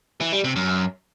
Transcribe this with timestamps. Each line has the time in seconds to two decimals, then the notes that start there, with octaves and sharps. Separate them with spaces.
0.21 E3
0.32 G3
0.44 C3
0.56 F#2